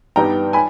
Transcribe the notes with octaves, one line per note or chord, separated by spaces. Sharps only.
G2 G3 B3 D#4 G5 A#5
G#5 B5